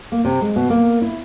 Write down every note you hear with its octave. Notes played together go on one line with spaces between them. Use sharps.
A#3
C3
G#3
B2
A#3
E4